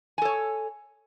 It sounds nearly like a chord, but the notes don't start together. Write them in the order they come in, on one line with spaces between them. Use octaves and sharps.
G#5 A4 C#5